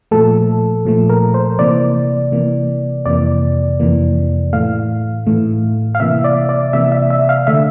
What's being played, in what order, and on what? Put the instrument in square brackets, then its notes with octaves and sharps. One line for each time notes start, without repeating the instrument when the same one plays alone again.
[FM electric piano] A#2 F3 A3 A4
A#2 F3 A3
A#4
C5
C3 E3 A#3 D5
C3 E3 A#3
F2 C3 E3 A#3 D5
F2 C3 E3 A#3
A2 E3 A3 F5
A2 E3 A3
F5
C3 E3 A#3 E5
D5
D5
C3 E3 A#3 E5
E5
E5
F5
D3 A3 E5